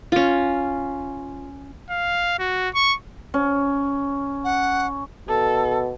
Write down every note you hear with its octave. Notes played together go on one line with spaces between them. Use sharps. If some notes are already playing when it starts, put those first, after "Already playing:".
C#4 F4
F5
F#4
C#6
C#4
F#5
B2 A4